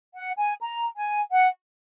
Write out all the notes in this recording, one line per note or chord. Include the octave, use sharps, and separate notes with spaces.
F#5
G#5
A#5
G#5
F#5